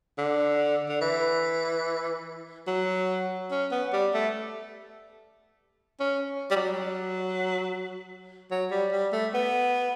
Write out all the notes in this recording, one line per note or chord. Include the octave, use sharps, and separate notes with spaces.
D3
D3
E3
F#3
C#4
B3
G3
A3
C#4
G3
F#3
F#3
G3
G3
A3
B3